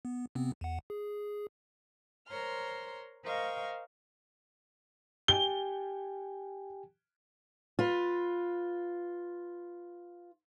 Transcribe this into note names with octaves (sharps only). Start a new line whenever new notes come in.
B3
C3 B3 C4
E2 F#5
G#4
A#4 C5 C#5 A#5 C6 F6
A#4 C5 D#5 F5 G5 C#6
G4 G5 G#5 G7
F4 B4